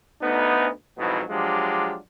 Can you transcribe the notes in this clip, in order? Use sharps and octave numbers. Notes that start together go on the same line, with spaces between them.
D2 B3 D#4
F2 G#2 B2 F#3 B3 E4
F3 F#3 G#3 D4 F4 G4